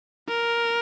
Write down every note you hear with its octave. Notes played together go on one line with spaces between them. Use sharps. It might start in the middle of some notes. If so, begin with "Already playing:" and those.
A#4